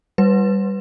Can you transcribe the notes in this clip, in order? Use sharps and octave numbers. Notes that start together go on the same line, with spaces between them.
G3 B4